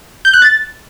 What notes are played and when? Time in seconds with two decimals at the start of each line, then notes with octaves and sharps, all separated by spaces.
0.25 G6
0.33 F#6
0.42 A6